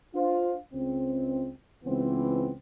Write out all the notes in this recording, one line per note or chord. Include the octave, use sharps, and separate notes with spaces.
D4 F4 C5 F5
C#2 C4
C#2 E3 B3 C4